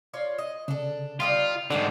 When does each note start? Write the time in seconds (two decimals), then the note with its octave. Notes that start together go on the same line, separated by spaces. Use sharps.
0.14 F4 C#5 D5
0.38 D#5
0.68 C#3 D4 A4
1.20 G3 D#4 F4 D5
1.70 G#2 D3 F#4 G4 C5 D5